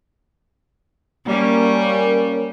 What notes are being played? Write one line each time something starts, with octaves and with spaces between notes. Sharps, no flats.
G3 A#3 C#4